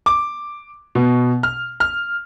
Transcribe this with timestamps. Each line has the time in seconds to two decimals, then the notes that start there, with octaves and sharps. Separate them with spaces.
0.06 D6
0.95 B2
1.43 F6
1.80 F6